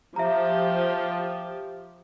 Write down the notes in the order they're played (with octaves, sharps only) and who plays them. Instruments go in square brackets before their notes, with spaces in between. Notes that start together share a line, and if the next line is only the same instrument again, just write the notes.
[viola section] F3 G4 [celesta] E5 A#5